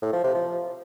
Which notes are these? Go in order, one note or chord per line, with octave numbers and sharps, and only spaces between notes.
A2
F3
C3
F3